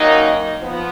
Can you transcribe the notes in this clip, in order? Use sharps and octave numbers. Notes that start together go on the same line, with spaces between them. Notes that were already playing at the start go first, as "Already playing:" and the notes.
Already playing: F#2 D#3 F#3 A#3 D#4
F3 B3